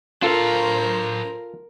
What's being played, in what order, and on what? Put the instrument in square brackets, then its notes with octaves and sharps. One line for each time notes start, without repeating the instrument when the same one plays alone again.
[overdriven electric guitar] D4 F5 [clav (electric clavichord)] F4 A4 [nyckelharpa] A#4 [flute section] C5